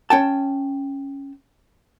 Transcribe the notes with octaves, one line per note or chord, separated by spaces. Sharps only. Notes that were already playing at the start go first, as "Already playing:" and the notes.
C#4 G5 A5